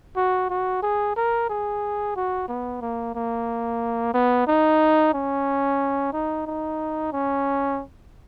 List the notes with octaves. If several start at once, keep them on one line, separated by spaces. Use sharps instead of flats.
F#4
F#4
G#4
A#4
G#4
F#4
B3
A#3
A#3
B3
D#4
C#4
D#4
D#4
C#4